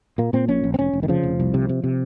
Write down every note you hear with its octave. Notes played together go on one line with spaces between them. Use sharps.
A#2 A#3
A#2 C4
A#1 C#4
A#1
C4
F1 C#4
F1
D#3
C#3 F3
F1
C2
C3
C3
C3